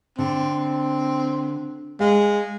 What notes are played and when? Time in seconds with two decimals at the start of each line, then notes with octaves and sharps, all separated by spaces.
0.19 D3 C4
2.00 G#3 F5